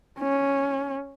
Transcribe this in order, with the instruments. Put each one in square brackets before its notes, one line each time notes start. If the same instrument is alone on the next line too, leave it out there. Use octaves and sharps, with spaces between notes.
[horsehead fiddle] C#4